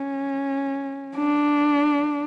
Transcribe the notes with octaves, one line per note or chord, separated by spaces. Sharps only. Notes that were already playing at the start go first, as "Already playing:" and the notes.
Already playing: C#4
D4